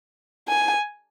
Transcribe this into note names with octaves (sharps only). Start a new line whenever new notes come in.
G#5